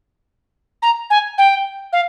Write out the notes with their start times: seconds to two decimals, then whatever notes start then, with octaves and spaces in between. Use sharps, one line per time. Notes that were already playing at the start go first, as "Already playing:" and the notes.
0.82 A#5
1.10 G#5
1.38 G5
1.92 F5